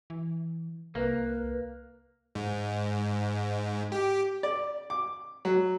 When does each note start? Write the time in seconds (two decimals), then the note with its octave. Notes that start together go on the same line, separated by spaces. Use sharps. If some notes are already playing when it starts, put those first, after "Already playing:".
0.10 E3
0.95 C2 A#3 B4
2.35 G#2
3.92 G4
4.43 D5
4.90 D6
5.45 F#3